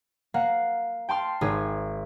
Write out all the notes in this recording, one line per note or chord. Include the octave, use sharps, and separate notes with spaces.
A#3 F5 F#5
G5 A5 C6 F6
G#1 G#4